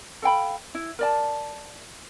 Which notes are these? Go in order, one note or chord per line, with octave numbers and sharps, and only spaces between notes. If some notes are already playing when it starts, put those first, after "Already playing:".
A4 F5 G5 B5
E4
A#4 D5 A5